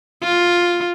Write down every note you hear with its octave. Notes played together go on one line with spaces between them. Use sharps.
F4